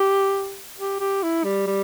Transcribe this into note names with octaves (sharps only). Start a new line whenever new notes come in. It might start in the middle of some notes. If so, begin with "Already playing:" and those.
Already playing: G4
G4
G4
E4
G3
G3